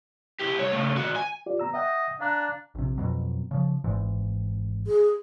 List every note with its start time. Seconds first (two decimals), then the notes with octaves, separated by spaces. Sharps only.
0.39 E4 G4
0.57 C2 C#5
0.72 C#3 A3
0.97 D#3 F#4
1.16 G#5
1.46 F4 G4 D5
1.59 B3 A#5 E6
1.74 D#5 E5 F#5 G5
2.21 D4 F5 A#5 F#6
2.75 A#1 C3
2.98 F2 B2 F#3
3.51 C#3 F3
3.84 G#1 G#2 E3
4.87 G#4